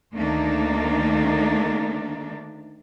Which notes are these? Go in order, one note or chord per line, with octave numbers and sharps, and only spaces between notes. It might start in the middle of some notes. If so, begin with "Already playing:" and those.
D2 D#3 A3 A#3 D4 D#4